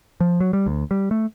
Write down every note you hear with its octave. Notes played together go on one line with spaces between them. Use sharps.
F3
F#3
G3
D2
G3
A3